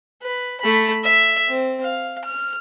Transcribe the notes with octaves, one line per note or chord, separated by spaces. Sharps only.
B4
A3 B5
E5
C4
F5
F6